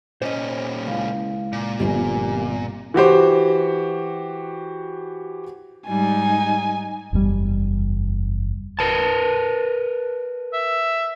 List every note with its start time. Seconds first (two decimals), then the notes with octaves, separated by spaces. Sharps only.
0.22 A#2 C#4 C5 D#5
0.87 C#2 E4 F5
1.53 A#2
1.80 G1 D2 F3 G3 B3 C4 G#5
2.94 E3 F#4 G4 C5
5.88 G#2 G3 D#4 G#5
7.13 F#1 E2 G2 G3
8.79 A#4 B4 A5
10.53 E5